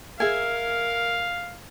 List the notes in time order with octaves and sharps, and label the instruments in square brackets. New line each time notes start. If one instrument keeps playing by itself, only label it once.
[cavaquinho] G#4 E5 G#5 [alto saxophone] A#4 [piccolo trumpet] F5